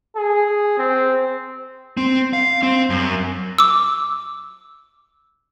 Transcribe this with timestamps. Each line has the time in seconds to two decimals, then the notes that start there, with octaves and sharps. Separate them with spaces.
0.17 G#4
0.78 C4
1.97 C4
2.33 F5
2.63 C4
2.90 F#2
3.58 D6 E6